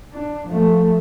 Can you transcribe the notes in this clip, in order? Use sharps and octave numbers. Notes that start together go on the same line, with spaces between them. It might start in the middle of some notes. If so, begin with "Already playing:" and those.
D4
F3 A3